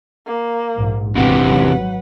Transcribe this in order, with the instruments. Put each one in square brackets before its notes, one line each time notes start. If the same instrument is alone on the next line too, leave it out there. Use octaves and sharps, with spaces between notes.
[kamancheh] A#3
[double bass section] A#1 G#2
[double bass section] G#1 G#2 [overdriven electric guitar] E2 C3 [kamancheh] B4 F#5
[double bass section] F#3